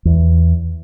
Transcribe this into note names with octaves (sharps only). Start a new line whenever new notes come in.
E2